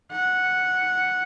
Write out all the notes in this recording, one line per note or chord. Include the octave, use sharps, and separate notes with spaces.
F#5